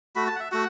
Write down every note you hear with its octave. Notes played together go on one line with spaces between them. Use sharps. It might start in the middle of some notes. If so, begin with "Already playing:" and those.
A3 F#4 B5
A5
F#5
E5
A3 F#4 F#5